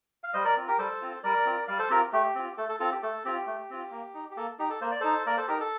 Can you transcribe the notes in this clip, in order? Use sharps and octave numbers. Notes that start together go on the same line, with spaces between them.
F5
G3 C5 D#5
A#4 D5
C4 F4
G4 A#4
G3 A4 C5
C4 F4
G3 A#4 D5
C4 F4
G3 D5 F5
A4 C5
C4 F4 G4 A#4
A3 G4
C4 F4
A3 A4
A4
C4 F4 A4
G4
A3 A4
C4 F4 G4
A3
C4 F4
A#3
D#4
G4
A#3 A4
D#4 G4
A4
A#3 C5
D5
D#4 A4 C5
A#3 A#4 D5
A4 C5
D#4 G4 A#4
A4